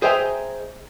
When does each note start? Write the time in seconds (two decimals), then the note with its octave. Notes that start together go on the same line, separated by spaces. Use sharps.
0.02 G#4 C5 D#5 E5 G5 A#5